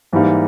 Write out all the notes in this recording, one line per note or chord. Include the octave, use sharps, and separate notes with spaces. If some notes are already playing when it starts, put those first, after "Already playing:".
G#2 E3 G3 A#3 D#4